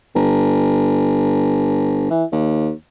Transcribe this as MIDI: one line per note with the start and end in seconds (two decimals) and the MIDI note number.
0.15 2.06 31
2.10 2.24 52
2.32 2.72 39